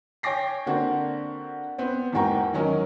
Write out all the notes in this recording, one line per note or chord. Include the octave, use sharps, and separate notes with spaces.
C#5 G5 G#5 D6 A#6 C7
D3 A#3 C4 D4 F#4
B3 C4
E2 G#2 A#3 F#4 G5 A#5
D#3 F#3 C#4 A#4 D#5